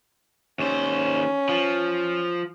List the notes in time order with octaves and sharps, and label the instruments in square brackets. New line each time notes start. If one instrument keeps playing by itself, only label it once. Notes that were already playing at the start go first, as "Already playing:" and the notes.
[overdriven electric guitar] D#2 C5 [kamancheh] C#4
[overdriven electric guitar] F3